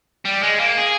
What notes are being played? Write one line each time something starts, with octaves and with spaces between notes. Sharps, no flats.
G3
G#3
A#3
G#4